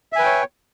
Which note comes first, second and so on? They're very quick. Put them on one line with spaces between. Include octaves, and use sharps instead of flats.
E5 G#5 B4 G5 C#5